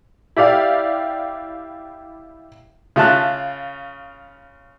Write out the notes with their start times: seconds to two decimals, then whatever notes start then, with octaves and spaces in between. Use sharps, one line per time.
0.36 E4 G4 D5 F5
2.96 C#3 F4 E5 A5 F#6